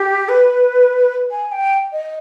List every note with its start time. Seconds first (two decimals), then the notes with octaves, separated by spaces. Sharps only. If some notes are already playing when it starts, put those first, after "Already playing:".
Already playing: G4
0.28 B4
1.31 G#5
1.51 G5
1.92 D#5